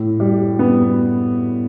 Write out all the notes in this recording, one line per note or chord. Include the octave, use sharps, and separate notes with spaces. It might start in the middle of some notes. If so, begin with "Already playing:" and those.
Already playing: A2
G3
B3